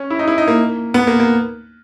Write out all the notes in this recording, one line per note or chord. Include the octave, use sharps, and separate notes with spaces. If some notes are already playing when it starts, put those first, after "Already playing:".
Already playing: C#4
E4
D#4
E4
D#4
A#3
B3
A#3
A#3